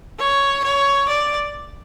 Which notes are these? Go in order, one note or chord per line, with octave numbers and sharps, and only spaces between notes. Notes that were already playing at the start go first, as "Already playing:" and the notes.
C#5
C#5
D5